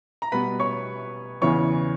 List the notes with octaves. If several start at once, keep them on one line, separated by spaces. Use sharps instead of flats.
A#5
B2 G3 B3 B4 B5
C#5 C#6
E2 C#3 E3 B3 C#5 C#6